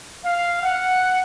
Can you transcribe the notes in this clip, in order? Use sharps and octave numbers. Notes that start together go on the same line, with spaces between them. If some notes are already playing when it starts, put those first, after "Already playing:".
F5
F#5